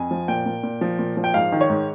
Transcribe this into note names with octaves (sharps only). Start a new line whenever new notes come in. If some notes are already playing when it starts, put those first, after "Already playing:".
Already playing: F2 G#5
F3
A#2 G5
A#2
A#2
F3
A#2
F3
G5
G#2 F5
D#3
C#5
G#2